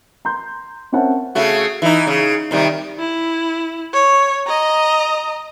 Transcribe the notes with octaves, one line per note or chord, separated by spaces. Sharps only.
A#5 C6 G6
C4 C#4 A#4 E5 F#5 A5
C#3 A3 F#4
E3 D#4
C#3
C3 D#3 G3
E4
C#5
D#5 A#5